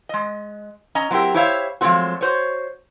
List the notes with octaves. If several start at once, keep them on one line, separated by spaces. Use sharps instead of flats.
G#3 D#5
C#4 D#5 A#5
F#3 C4 E4 F4 G4 A#4
E4 G4 C5 C#5 E5 F5
F3 F#3 G#3 A3 C4 F#4
F#4 C5 C#5